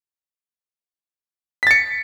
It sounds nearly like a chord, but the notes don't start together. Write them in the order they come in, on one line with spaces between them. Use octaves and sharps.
B6 A6 C#7